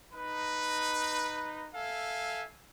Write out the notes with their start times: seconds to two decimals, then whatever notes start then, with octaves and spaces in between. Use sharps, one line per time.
0.14 D#4 B4
1.75 A4 E5 F5 G#5